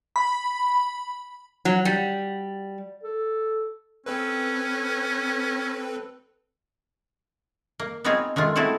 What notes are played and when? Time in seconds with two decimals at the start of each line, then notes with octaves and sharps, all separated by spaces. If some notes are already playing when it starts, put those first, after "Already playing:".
0.16 B5
1.65 F#3
1.85 G3
3.04 A4
4.06 C4 C#4 A4 B4
7.80 A#3
8.04 B3 C4 D#4 F4 G#4 C#5
8.36 D#3 G#3 A3 F4
8.56 A3 C4 E4 F#4 G#4 A4